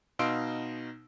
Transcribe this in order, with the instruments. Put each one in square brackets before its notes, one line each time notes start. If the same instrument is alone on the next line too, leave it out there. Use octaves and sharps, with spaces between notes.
[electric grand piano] B2 D#4 F5 C6 E6 D7